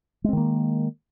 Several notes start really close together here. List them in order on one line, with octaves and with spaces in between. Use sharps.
G#3 C4 D#3 A#3